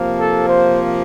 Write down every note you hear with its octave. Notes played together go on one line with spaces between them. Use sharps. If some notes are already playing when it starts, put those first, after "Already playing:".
Already playing: C3 F3 A#3
A4
C5